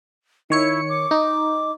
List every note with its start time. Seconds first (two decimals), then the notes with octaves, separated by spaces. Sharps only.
0.50 D#3 E4 C#5 C#7
0.89 D6
1.11 D#4